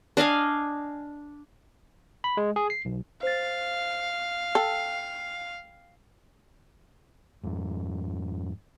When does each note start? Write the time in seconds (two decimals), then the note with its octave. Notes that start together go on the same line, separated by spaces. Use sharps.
0.17 D4 D#5 F5 G#5
2.24 B5
2.37 G#3
2.56 G#4
2.70 C7
2.85 B1
3.23 C5 F5 A6
4.55 A4 G5
7.43 F2 G#2